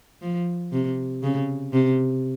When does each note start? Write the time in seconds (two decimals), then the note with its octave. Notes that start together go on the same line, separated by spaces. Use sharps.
0.22 F3
0.72 C3
1.23 C#3
1.73 C3